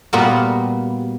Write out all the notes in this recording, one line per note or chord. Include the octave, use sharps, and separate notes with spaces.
A#2 G3 A#3 B3 F4 F#4